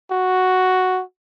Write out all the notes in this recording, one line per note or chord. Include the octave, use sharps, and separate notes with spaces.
F#4